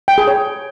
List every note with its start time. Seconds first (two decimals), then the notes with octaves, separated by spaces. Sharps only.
0.08 G5
0.18 G#4
0.28 C#5